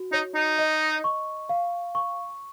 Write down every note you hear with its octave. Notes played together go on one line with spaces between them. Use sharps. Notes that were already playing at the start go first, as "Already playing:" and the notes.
Already playing: F#4
D#4 C#5
D#4
D#5
C#6
F5
C#6